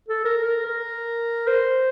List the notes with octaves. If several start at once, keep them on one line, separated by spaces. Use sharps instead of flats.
A4
A#4
A#4
A#4
C5